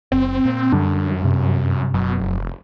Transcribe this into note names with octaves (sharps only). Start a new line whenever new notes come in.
F#1 C4
A#2
F#2 D3 G3 D4
G2 C3
F#1 F#2 B2 F#3
F1